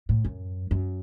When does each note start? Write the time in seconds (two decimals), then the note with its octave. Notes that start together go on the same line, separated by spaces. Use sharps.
0.09 A2
0.25 F#2
0.71 F#2